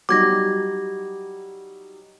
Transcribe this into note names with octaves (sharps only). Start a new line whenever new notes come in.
F#3 G3 D#4 D6 G#6 A#6